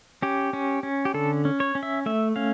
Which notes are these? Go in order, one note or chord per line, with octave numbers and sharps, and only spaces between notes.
C#4 G4
C#4
C#4
G4
D3 A4
C#4
C#5
C#4
E5
A3 E5
C#4 F5